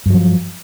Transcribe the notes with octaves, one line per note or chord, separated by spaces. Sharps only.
G2 F3 F#3